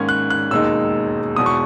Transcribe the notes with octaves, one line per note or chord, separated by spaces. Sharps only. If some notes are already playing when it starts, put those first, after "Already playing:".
Already playing: G#2 D#3 A#3 C#4 G#6
F#6
F#6
E1 D#2 D#3 G#3 D#4 E6
E1 E2 B2 G#3 D#6
C#6